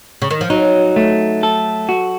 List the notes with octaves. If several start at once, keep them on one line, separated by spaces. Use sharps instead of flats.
C#3
D#3
F3
F#3 D#4
A3
A4
F#4